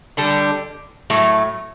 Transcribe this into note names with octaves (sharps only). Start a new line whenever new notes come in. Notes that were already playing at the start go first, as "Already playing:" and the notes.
D3 G3 D4 A4
A2 F#3 A3